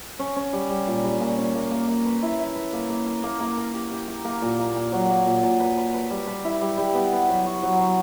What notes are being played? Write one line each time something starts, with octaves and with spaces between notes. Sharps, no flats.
C#4
C#4
G3
G3
A#2
G3
A#2
C#4
A#3
A#3
A#3
B4
E4
E4
B4
A#3
A#3
A#4
A#3
A#3
A#4
G4
G4
G4
A#3
A#2
A#3
A#2
F#3
A#3
A#2
A#2
B4
B4
B4
G3
B4
E4
G3
G3
B3
B3
F#3
F#4
F#3
F#3